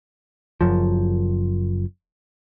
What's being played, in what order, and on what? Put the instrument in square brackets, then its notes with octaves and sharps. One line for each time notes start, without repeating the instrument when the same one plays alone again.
[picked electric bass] F#1 F#2 F3